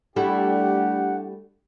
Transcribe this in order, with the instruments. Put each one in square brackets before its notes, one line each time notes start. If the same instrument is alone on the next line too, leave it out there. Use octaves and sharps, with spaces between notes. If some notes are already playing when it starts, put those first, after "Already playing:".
[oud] G3 A3 E4 [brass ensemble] D4 G4 [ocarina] F#5